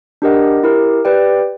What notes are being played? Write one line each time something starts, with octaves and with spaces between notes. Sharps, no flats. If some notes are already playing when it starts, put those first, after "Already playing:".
D4 G4 A#4 D#5 F#5
E4 G4 A#4
G4 B4 D5 G5